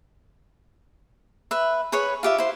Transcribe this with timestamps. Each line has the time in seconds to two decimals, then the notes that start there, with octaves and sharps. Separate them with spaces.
1.51 B4 E5
1.92 G#4 B4 C#5 B5
2.23 F4 G4 E5
2.38 E4 C5